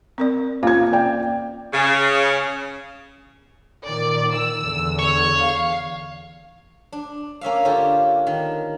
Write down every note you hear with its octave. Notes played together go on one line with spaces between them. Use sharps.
C4 A#4 D5
A#3 C#4 F4 F5 G#6
D5 G5
C#3
A#2 D#3 D5
E6
E2 D3
C#5
F5
D4
A#3 C#4 E5 F5
D3 C#4 F4 G4
D#3